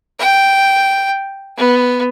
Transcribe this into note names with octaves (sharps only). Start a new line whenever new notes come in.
G5
B3